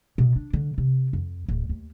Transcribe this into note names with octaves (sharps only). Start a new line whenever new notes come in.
B2
D4
D3
C3
F2
D1
D#2